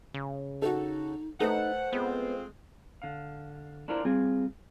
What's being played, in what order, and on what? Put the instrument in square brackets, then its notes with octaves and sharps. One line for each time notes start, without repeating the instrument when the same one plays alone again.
[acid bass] C#3
[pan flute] D#4 [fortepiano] F#4 A4
[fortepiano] A3 A4 B4 [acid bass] D#4 [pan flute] C5 [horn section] F#5
[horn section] G#3 C4 F4 [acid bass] B3
[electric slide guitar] D3 F5
D4 E4 F4 A#4 C5 D5
G3 C4 F4 G#4